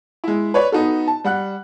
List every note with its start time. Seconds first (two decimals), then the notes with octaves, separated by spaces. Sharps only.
0.24 G#3 E4
0.54 B4 C#5 D5
0.72 B3 D#4 F#4 A4
1.08 A5
1.24 G3 F#5 F#6